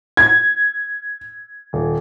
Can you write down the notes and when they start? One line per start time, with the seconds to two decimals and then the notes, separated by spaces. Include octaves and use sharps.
0.17 G#6
1.73 D#1